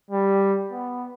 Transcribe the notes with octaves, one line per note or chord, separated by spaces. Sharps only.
G3
B3